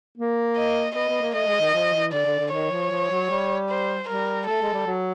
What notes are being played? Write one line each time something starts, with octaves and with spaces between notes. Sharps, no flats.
A#3
D#5
B3 D#5
B3
A#3
A3 D#5
G#3
D#3
F3
E3
D3 D5
D3
D3
D#3 C#5
F3
F3
F#3
G3
C5
G3 A#4
A3 A4
G#3
G3
F#3